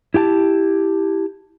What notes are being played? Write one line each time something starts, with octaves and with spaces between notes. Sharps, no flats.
E4 G4 G5 A5